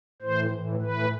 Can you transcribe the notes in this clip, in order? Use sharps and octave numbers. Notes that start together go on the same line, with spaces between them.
A2 E3 C5
A2 E3
A2 E3 B4